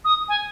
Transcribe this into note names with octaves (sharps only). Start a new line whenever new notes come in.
D#6
G#5